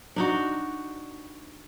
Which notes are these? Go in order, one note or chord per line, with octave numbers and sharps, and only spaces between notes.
D4 D#4 F#4